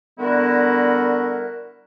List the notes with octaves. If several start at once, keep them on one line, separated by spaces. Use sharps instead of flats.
D3 G3 B3 E4 F#4 A#4